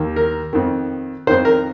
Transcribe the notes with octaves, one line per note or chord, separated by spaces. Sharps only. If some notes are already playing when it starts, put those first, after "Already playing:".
Already playing: D#2 D#3
A#4
F2 D#3
F2 D#3 C5
A#4